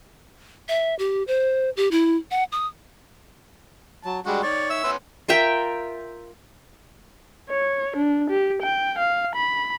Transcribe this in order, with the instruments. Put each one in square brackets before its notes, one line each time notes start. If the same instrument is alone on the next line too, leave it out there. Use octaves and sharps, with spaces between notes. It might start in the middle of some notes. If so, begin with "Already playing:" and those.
[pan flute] E5
G4
C5
G4
E4
F#5
D#6
[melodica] F#3 [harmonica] A5
[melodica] G3 G#3 [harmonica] D4 F#4
[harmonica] D#3 C#5 [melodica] D5
[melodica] E5 E6
[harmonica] B3 C#4 C6
[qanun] F4 A#4 E5 G5
[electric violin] C#5
D4
G4
G5
F5
B5